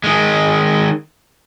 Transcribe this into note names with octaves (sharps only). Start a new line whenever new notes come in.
D#3 G#3